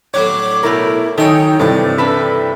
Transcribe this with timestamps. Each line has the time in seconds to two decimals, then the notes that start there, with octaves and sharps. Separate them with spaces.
0.14 A2 F#3 D4 C#5 D6
0.63 B2 A3 E4 A#4
1.18 D#3 F#3 D#4 A4 C#5 G5 G#5
1.60 G2 C3 E3 A3 D5
1.98 D4 A4 B4 E5